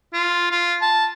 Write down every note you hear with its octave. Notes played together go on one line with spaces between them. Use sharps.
F4
F4
A5